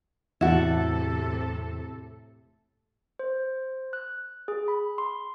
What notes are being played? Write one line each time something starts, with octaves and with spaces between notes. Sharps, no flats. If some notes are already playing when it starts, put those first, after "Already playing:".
E2 A2 C3 E4 F#4 A4
C5
F#6
G#4
B5
C6